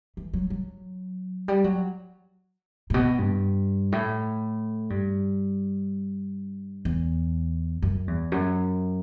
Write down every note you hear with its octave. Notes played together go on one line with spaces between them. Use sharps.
E3
F#3
F#3
G3
F#3
A2
B2
G2
A2
G2
E2
F#2
E2
F#2